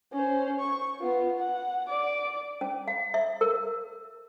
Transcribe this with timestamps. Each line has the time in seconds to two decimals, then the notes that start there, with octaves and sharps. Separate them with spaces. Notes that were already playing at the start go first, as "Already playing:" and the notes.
0.13 C#4 C5
0.59 C#6
1.00 B3 F4
1.39 F#5
1.88 D5 D6
2.61 C#4
2.88 F5
3.14 E5
3.41 A#4